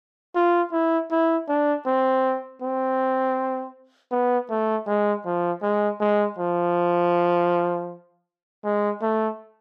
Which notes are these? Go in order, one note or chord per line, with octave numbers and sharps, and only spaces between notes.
F4
E4
E4
D4
C4
C4
B3
A3
G#3
F3
G#3
G#3
F3
G#3
A3